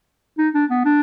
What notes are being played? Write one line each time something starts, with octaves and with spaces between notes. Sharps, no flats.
D#4
D4
B3
D4